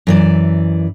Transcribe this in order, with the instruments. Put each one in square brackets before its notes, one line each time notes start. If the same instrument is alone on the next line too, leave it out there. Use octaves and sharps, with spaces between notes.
[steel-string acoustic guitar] F#2 E3 D5